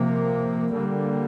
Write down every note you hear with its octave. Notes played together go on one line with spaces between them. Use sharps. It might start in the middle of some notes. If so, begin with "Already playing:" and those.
Already playing: C3 F3 A#3
D3 G3 A#3